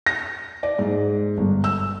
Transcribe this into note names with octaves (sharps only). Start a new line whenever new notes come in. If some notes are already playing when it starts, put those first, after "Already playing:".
A#6
D5
G#2
G1
E6